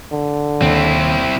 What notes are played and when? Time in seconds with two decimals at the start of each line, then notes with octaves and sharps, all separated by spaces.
0.12 D3
0.62 D#2 C4 E4